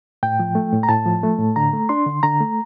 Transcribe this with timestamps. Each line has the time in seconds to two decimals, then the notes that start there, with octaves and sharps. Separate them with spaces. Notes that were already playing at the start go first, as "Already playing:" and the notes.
0.23 A2 G5
0.40 F3
0.55 A3
0.73 A2
0.83 A#5
0.89 A2 A5
1.06 F3
1.23 A3
1.39 A2
1.56 D3 A#5
1.73 A3
1.89 D4 C6
2.06 D3
2.23 D3 A#5
2.40 A3